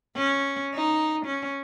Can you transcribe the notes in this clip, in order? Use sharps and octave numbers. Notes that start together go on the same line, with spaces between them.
C#4
D#4
C#4